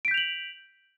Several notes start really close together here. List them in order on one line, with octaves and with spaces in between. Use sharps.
D7 B6 G6 F7 F#7